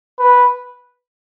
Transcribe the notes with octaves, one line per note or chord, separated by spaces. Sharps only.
B4